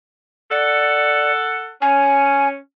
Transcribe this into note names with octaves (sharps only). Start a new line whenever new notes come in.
A4 D5 F#5
C#4 G#5